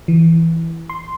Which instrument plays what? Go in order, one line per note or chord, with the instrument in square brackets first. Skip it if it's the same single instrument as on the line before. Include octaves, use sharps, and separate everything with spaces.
[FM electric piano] E3
C6